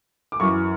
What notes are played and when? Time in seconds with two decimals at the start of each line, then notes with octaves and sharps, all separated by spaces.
0.32 D6
0.40 F#2 E3 C#6